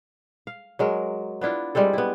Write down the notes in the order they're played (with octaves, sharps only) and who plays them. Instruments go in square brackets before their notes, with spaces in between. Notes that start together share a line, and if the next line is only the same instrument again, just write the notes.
[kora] F5
F#3 G#3 A#4
B3 D4 E4 F4
G3 G#3 C4 A4
B3 E4